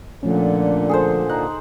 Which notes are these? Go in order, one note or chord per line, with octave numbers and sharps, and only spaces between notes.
A#2 D3 F3 A3 C#4
G#4 A4 C5
D#4 F#6